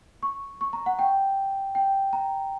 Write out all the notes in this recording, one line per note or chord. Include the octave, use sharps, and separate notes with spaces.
C#6
C#6
A#5
F#5
G5
G5
A#5